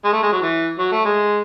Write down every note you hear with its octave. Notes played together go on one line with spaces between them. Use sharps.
G#3
A3
G#3
F#3
E3
F#3
A3
G#3